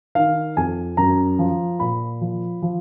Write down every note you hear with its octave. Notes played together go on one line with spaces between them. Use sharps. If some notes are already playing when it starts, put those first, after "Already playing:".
D#3 F5
F2 G#5
F#2 A#5
F3
A#2 B5
F3
F3